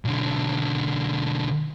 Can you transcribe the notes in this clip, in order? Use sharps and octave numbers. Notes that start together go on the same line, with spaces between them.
B1 D3